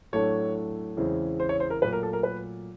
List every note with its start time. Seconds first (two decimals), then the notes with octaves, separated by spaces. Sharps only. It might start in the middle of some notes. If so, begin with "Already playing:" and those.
0.13 A2 F#3 A3 D4 C#5
0.97 E2 C#3 E3 G#3 C4
1.40 C5
1.49 C#5
1.60 C5
1.70 A#4
1.81 A#2 F#3 A3 B4
1.93 A#4
2.03 A4
2.13 A#4
2.23 B4